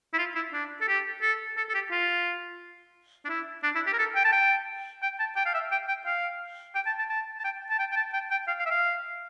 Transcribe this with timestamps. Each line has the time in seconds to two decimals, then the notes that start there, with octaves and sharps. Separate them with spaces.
0.13 E4
0.18 F4
0.35 E4
0.53 D4
0.81 A4
0.88 G4
1.22 A4
1.57 A4
1.69 A4
1.74 G4
1.91 F4
3.25 D4
3.29 E4
3.63 D4
3.75 E4
3.87 G4
3.93 A#4
3.99 A4
4.16 G5
4.25 A5
4.32 G5
5.02 G5
5.20 A5
5.36 G5
5.46 F5
5.54 E5
5.72 G5
5.88 G5
6.06 F5
6.75 G5
6.86 A5
6.99 A5
7.09 A5
7.39 A5
7.44 G5
7.70 A5
7.79 G5
7.92 G5
7.96 A5
8.13 G5
8.31 G5
8.47 F5
8.59 F5
8.66 E5
8.71 F5